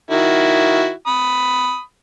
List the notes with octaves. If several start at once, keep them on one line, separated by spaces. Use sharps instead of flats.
D#3 E4 F#4
B5 D#6